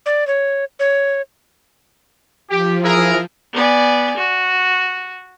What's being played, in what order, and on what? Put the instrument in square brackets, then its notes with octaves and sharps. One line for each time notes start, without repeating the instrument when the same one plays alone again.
[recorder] D5
C#5
C#5
[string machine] F3 [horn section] G4
[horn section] E4 G#4 A#4
[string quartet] B3 D5 G#5
F#4